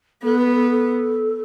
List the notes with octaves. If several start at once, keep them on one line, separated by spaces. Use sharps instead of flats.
B3 A4
B4
A4
A4